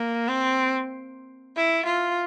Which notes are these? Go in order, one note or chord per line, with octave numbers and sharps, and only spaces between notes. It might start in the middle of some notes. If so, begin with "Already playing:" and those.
Already playing: A#3
C4
E4
F4